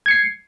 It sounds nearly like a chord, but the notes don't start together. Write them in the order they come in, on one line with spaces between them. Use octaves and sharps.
G#6 C#7 C7